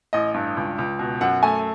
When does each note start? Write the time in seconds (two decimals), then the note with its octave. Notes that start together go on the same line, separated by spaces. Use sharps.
0.13 A1 D#5
0.34 G2
0.57 C#2
0.78 C#2
0.99 B2
1.21 F#2 F#5
1.43 A3 G#5